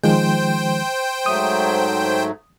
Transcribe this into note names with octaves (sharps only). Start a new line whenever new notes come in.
D#3 F3 G#3 C5 G5
G#2 F#3 A3 D#6